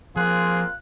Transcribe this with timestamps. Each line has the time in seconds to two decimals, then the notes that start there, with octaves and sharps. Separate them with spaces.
0.16 F3 A#3 C4 F4 G#4 F#6